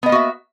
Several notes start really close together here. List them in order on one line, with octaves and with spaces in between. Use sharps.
B3 D#5 A#3 F#4 E5